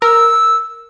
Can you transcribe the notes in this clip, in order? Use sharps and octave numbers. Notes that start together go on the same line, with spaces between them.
A#4 E6